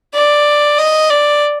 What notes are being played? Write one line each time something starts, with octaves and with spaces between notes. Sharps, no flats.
D5
D#5
D5